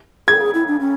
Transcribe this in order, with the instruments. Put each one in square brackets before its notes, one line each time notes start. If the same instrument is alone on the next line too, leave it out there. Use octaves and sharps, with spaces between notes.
[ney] G#4 [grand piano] G#6
[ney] A4
G#4
E4
D4
C#4